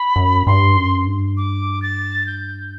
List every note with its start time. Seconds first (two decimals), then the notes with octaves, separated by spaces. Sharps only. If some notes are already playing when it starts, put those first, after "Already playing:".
Already playing: B5
0.16 F#2
0.47 G2 C6
0.77 F#2
1.06 G2
1.37 D6
1.82 A6
2.27 G6